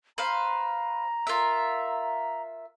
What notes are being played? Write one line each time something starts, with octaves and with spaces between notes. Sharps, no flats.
B4 C5 F5 A#5
F4 A#4 E5